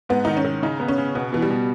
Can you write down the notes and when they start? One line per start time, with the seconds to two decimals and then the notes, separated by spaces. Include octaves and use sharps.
0.09 G#2 B3
0.25 D#3 D#4
0.37 C#4
0.44 D#3
0.62 C#3 D#4
0.80 B3
0.88 C#4
0.98 C#3
1.15 B2 B3
1.33 B2 E3
1.42 G3
1.50 B2